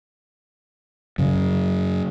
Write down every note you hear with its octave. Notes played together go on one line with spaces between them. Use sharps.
F#2 C#3